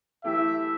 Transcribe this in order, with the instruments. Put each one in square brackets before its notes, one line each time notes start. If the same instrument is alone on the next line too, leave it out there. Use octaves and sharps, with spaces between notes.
[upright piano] E3 A3 E4 G4 [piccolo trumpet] E5